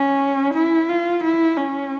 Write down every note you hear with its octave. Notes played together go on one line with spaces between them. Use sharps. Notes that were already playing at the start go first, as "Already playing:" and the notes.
Already playing: C#4
E4
F4
E4
C#4